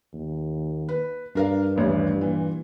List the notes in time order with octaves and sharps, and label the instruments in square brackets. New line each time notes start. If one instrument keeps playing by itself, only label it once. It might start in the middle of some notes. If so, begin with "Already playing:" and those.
[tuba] D#2
[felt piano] B4
[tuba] G2 [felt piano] D4 A#4 F5
[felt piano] D#1 A1 G3
A#2 E3